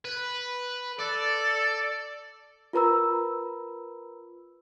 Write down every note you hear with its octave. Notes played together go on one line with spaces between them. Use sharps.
B4
A4 D5
F4 A#4 B4 A#5 B5 E6